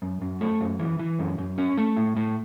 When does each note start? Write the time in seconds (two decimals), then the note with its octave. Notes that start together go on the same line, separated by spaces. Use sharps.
0.02 F#2
0.22 F#2
0.41 A3
0.60 F#2
0.79 E3
0.99 E3
1.19 F#2
1.38 F#2
1.58 C#4
1.78 A3
1.97 A2
2.16 A2